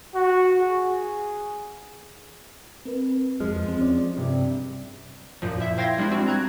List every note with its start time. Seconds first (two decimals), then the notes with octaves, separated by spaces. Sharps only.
0.15 F#4
0.59 G#4
2.85 C4 A#4 B4
3.40 F2 F3 G#3 F6
3.65 E2 C4
3.81 C#4 D5
4.17 G2 C3
5.42 F#2 A#2 F3
5.60 E4 E5
5.78 C5 F5 G5 C6 G#6 A#6
5.98 G3 G#3 D4 E4
6.12 C4 F#4
6.28 A#5 F#6 G#6